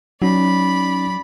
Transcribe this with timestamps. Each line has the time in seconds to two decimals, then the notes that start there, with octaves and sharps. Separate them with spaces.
0.22 F#3 C#4 D#4 D5 B5